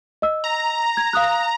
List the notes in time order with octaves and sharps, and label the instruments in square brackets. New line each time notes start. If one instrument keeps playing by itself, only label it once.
[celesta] D#5 E6
[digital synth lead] A#5
[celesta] G#6
F5 D#6 F#6